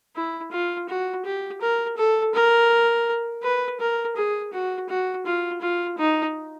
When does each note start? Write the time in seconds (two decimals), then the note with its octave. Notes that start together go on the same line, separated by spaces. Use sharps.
0.16 E4
0.51 F4
0.89 F#4
1.25 G4
1.61 A#4
1.97 A4
2.34 A#4
3.43 B4
3.80 A#4
4.16 G#4
4.53 F#4
4.89 F#4
5.26 F4
5.61 F4
5.98 D#4